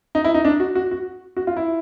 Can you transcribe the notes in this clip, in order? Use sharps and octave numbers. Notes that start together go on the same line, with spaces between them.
D#4
E4
D#4
D4
F#4
F#4
F#4
F#4
F4
E4